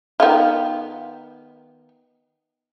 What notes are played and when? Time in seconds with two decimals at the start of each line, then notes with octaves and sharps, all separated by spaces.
0.20 D#3 B3 F4